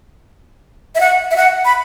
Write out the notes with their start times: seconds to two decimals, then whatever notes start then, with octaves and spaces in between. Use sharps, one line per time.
0.95 E5
1.00 F#5
1.31 E5
1.36 F#5
1.65 B5